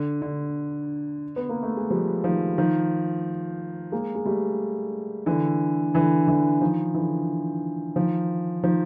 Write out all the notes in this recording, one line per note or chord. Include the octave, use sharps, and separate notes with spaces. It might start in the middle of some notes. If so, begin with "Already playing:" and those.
Already playing: D3
D3
B3
A#3
A3
G#3
F3 G3
D#3 F3
D#3 F3
G#3 A#3
G#3
G3 A3
D3 E3
D3 E3
D3 E3
D#3 F3
D3 E3
D#3 F3
D#3 F3